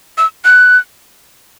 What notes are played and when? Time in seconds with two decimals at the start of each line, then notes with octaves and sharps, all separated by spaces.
0.18 E6
0.45 F#6